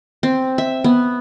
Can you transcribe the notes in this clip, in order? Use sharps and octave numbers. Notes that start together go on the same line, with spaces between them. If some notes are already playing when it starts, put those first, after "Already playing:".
C4
E5
B3